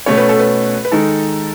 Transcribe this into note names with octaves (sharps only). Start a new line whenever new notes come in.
B2 A3 C#4 C#5
B4
A4
B4
B4
D#3 G#3 D#4 A4